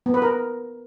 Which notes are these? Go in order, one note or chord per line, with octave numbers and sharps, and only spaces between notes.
B3
B4
A#4